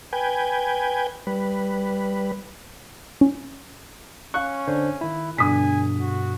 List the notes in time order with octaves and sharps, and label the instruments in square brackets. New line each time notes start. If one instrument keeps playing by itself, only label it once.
[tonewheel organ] B4 G5 G#5
G3 B4
[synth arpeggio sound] C#4
[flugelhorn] C#4 [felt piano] F5 F#6 [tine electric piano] C#6
[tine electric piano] D3 D4 C5
D#3 E4
[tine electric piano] G2 B2 [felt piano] D3 D#6 B6 [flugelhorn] G#5
[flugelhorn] F#4